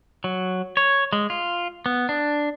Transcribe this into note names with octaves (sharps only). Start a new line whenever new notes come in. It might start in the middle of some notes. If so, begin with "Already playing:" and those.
F#3
C#5
G#3
F4
B3
D4